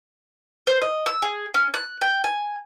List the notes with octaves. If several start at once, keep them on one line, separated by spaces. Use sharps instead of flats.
C5
D#5
E6
G#4
C#4
F#6
G5
G#5